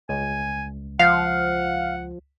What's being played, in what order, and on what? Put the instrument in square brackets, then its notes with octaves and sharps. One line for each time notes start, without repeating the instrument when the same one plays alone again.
[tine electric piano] C#2 [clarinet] G#5
[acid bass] F3 [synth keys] F5 [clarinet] F#5